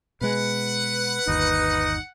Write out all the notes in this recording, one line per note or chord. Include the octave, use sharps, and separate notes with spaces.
B2 G#3 B4 F#5
G1 D#2 D#4